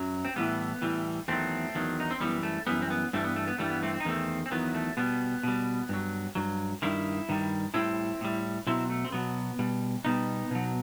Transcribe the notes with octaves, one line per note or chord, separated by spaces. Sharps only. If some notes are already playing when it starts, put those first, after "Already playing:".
Already playing: F#2 F#3
C4
A2 E3 G3 B3
A2 E3 G3
E2 D#3 F#3 A3 C4
E2 D#3 F#3
D#4
C4
F#2 E3 G3 B3
A3
F#2 E3 G3 B3
C4
B3
G2 E3 G3 A3 C4
B3
A3
B3
G2 E3 G3 A3
B3
A3 C4
C4
D#4
E2 D#3 F#3 A3 C4
C4
E2 D#3 F#3 B3
A3
B2 G3 B3
B2 G3
G2 F#3
G2 F#3
G2 D#3 G3 E4
G2 D#3 G3
A2 G3 C4 E4
A2 G3
B2 F#3 C4 E4
A3
C4
B2 F#3 B3
B2 G3
B2 G3 B3 D#4
B2 F#3